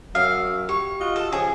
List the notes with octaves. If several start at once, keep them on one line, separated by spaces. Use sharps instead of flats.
F#2 F#3 F5 D#6 E6
G4 C#6
F4 F#4 D#5
A4
C#3 F3 C#4 G#4 G#5